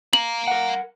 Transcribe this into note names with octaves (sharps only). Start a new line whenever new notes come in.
F5 A#5 F#7
A#4 F#5